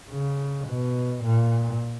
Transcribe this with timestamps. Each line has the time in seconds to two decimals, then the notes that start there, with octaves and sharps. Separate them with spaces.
0.11 C#3
0.67 B2
1.23 A#2